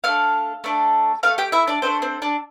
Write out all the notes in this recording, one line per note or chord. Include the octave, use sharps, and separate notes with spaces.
A3 D4 A4 F5 F6
A3 D4 A4
A3 D4 A4 F5 F6
G4 G5
E4 E5
D4 D5
A3 C4 D4 A4 C5
C4 C5
D4 D5